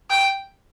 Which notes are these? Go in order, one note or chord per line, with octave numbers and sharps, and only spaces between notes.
G5